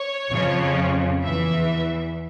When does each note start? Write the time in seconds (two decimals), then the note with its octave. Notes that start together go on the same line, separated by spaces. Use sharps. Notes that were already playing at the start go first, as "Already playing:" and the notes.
Already playing: C#5
0.31 F2 C#3 F3
1.22 E2 E3 E5